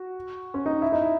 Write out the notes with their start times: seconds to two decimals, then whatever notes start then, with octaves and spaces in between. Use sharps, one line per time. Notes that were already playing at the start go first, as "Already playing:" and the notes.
Already playing: F#4
0.54 C#4
0.66 D#4
0.82 E4
0.92 D#4
1.01 E4